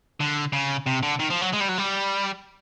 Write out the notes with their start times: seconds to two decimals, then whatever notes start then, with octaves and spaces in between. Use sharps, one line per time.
0.20 D3
0.53 C#3
0.86 C3
1.03 D3
1.20 D#3
1.31 F3
1.42 F#3
1.53 G#3
1.61 G3
1.69 F#3
1.78 G3